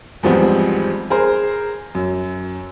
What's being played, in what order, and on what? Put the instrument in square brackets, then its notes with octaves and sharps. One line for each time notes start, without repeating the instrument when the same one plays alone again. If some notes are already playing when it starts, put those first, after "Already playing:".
[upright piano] E2 G#2 F3 G3 B3 C4
G#4 A#4 C5
F#2